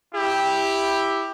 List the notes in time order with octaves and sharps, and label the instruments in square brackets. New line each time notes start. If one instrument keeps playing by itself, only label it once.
[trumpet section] E4 G4